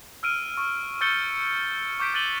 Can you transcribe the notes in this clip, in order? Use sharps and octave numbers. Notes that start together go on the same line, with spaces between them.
E6 F6 D7 D#7
C#6
C#6 E6 G6 A6 C#7 G7
C#6 D6 G6 B6 D7
D6 F#6 A6 D#7 F#7 G7